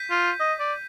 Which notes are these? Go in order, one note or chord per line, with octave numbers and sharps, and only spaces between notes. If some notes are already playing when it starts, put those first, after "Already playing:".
Already playing: G6 B6 D#7
F4
D#5
D5